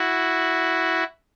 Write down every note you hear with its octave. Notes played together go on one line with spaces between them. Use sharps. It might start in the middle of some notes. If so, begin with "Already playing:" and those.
Already playing: E4 F#4